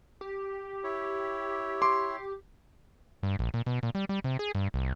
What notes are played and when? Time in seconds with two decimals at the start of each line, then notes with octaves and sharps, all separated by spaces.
0.21 G4
0.84 E4 C#5
1.82 C6 D6
3.23 G2
3.39 A#1
3.54 A#2
3.66 B2
3.83 A#2
3.95 G3
4.09 G3
4.24 C3
4.39 G#4
4.55 G2
4.74 C2